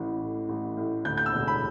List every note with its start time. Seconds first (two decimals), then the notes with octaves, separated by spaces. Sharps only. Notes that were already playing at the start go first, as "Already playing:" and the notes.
Already playing: A1 A2 E3
0.21 A2
0.49 A1
0.77 A2
1.05 D2 G6
1.18 G6
1.26 E6
1.33 E1
1.48 B5